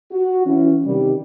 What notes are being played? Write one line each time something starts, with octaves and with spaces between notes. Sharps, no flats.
F#4
E3 C#4
C3 D#3 G3